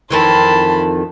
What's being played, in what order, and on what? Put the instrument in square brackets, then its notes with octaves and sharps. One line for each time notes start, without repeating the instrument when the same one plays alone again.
[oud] F2 D#3 E3 [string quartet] A5 B5 C6